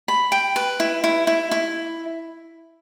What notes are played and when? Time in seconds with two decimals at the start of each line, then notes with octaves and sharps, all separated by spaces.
0.08 B5
0.32 G5
0.56 B4
0.80 E4
1.04 E4
1.27 E4
1.51 E4